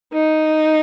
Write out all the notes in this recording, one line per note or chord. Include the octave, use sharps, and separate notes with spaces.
D#4